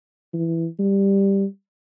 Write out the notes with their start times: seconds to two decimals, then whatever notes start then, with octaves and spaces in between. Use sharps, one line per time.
0.34 E3
0.80 G3